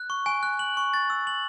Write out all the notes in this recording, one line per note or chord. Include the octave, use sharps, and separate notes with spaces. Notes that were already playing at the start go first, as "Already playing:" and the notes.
Already playing: F#6
C#6
G#5
F#6
F#7
C#6
A6
E6
F#7